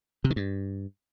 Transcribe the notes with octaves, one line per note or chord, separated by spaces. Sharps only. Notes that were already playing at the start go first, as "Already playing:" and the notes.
C3
D#3
G2